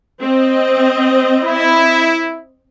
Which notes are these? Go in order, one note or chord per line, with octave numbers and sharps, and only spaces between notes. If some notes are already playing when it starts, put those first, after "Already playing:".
C4 D#5
E4